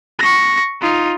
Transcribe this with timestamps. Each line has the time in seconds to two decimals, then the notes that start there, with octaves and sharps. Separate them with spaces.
0.19 C#6 A#6
0.81 D#4 F4